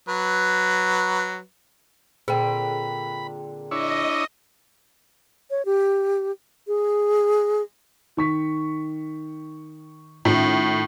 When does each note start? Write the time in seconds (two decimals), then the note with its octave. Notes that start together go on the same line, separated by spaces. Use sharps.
0.09 F#3 B4
2.28 A#2 D3 C4 G#4 G5 B5
3.71 D4 E4 C#5 D#5
5.50 C#5
5.65 G4
6.68 G#4
8.17 D#3 C#6 B6
10.25 A2 D#3 C#4 F4